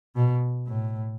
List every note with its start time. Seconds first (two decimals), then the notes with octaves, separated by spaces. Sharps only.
0.16 B2
0.67 A2